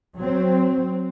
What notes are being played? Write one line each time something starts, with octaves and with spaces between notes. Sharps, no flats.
F#3 C4